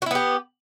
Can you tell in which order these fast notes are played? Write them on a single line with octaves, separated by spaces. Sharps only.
F#4 E4 B3 G4